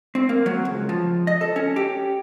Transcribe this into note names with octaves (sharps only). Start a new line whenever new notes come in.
C4
A#3
F#3
C#2
F3
D#5
A4
C#4
G4